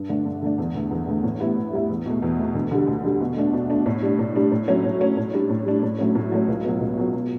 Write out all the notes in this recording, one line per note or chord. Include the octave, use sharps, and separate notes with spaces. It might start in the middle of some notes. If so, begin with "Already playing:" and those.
Already playing: G2
D3 A3 D4
G2
D3 A3 D4
E2
D3 A3
E2
D3 A3
A2
G3 B3 E4
A2
G3 B3 E4
E2
B2 A3
E2
B2 A3
D2
D3 G3
D2
D3 G3
B2
A3 D4
B2
A3 D4
A2
G3 D4
A2
G3 D4
A2
F#3 A3 C#4
A2
F#3 A3 C#4
A2
G3 D4
A2
G3 D4
A2
F#3 A3 C#4
A2
F#3 A3 C#4
C#2
B2 F#3
C#2
B2 F#3
B2